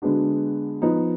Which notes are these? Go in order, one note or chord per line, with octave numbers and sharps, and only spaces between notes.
D3 G#3 B3 D4 F#4
F3 B3 D#4